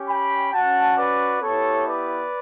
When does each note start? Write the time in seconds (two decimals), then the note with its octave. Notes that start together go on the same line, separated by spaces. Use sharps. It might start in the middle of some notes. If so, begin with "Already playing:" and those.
Already playing: C#4 G4
0.08 G5 B5
0.53 C#4 F#4 F#5 A5
0.97 B4 D5
1.41 B3 E4 G4 A4 C#5
1.86 B4 D5